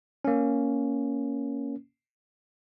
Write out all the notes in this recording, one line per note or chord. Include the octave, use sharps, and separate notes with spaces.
A#3 C#4